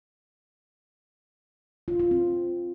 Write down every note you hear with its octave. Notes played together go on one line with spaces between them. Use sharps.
F4
F4
C4